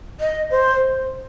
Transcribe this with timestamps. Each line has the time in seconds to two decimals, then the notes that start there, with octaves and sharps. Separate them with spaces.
0.20 D#5
0.51 C5